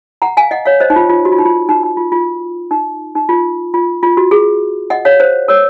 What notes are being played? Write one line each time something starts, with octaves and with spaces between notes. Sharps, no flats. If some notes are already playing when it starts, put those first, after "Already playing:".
F#5 A#5
F5 G#5
D#5 F#5
C#5 F5
C5 D#5
D#4
F4
F4
F#4
F4
D#4
F4
D#4
D#4
F4
F4
D#4
D#4
F4
F4
F4
F#4
G#4
D#5 F#5
C#5 F5
C5
A#4 C#5